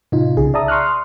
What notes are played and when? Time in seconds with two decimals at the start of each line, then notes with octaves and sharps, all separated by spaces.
0.12 A2 C3 D#4 F4
0.37 C2 C#3 G#4
0.54 D5 E5 A5 A#5 D#6
0.68 C6 C#6 D#6 F6 F#6